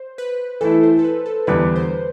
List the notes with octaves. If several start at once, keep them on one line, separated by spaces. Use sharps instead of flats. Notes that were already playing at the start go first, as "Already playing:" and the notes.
Already playing: C5
B4
E3 A3 E4 A4
C5
A4
B4
A4
E2 D3 G3 B4
C5